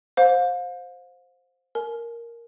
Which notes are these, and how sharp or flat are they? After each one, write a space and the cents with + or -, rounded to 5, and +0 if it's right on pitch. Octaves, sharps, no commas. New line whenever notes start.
C5 +0 F5 +35
A#4 +0 G#5 +35